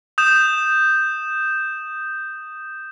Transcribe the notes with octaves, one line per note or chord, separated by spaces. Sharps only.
D#6 G6 E7